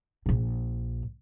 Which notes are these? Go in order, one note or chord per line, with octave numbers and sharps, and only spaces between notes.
A#1 A#2